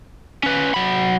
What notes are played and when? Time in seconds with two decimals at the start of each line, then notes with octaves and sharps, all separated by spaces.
0.43 C#4 B4
0.74 F#3 B5